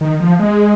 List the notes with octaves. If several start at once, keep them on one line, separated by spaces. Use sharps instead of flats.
D#3
F3
G#3